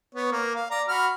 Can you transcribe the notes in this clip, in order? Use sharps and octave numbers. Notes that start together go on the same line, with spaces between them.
B3 C#5
A#3 A#4
F5
D5 A#5
F#4 B5 F6